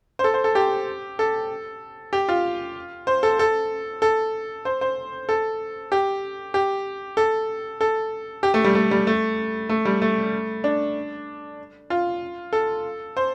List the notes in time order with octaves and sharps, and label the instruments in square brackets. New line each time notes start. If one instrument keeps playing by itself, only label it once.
[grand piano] C5
A4
C5
A4
G4
A4
G4
F4
C5
A4
A4
A4
C5
C5
A4
G4
G4
A4
A4
G4
A3
G3
A3
G3
A3
A3
G3
A3
D4
F4
A4
C5